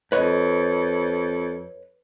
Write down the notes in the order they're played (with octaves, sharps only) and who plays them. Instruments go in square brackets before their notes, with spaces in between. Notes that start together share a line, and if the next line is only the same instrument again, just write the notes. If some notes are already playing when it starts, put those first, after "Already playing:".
[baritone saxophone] F2 [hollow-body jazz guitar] B4 C#5 D#5